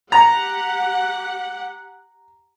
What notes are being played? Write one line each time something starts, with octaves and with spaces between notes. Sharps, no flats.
G4 F#5 A#5